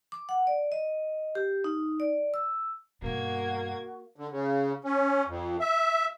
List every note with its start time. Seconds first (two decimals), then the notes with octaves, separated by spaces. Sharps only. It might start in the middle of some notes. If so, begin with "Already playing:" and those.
0.12 D6
0.29 F#5
0.47 D5
0.72 D#5
1.35 G4
1.64 D#4
2.00 D5
2.34 E6
3.02 G2 B2 A#3 F#4 G#6
4.16 D3
4.31 C#3
4.84 C#4
5.27 F2
5.60 E5